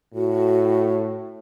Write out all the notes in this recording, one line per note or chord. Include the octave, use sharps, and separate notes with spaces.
A2 F#4